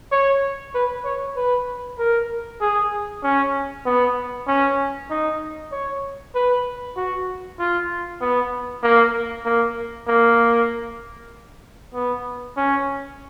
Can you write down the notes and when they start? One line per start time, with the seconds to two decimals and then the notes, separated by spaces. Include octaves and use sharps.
0.12 C#5
0.75 B4
1.05 C#5
1.36 B4
1.99 A#4
2.61 G#4
3.23 C#4
3.86 B3
4.48 C#4
5.10 D#4
5.72 C#5
6.35 B4
6.97 F#4
7.59 F4
8.21 B3
8.83 A#3
9.45 A#3
10.08 A#3
11.94 B3
12.57 C#4